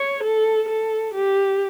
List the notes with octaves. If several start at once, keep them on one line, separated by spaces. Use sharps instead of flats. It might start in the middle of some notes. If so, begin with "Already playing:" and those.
Already playing: C#5
A4
A4
G4